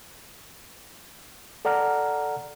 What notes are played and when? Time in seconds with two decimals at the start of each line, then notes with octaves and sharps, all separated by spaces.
1.65 A4 D5 F#5 A#5 F6